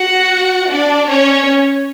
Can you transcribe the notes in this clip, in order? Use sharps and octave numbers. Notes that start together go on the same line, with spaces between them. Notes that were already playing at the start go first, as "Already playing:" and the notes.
Already playing: F#4 F#5
D4 D5
C#4 C#5